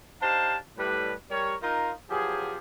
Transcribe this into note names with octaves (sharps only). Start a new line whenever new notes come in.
D4 D#4 G4 C5 F5 A5
A2 G3 B4
G3 A#4 C#5
D#4 F4 A#4
F3 F#3 B3 G4 G#4